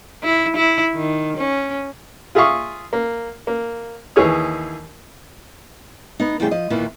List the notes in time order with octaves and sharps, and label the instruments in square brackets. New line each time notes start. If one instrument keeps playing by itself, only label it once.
[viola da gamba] E4
E4
D#3
C#4
[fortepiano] F4 G#4 E5 F5 C#6 D#6
A#3
A#3
D#2 E3 G#4 C#5 D#6
[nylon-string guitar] B3 D#4
E2 A2 C#3 G3 G#4 G5
F3 D#5
E2 A#2 D#3 E3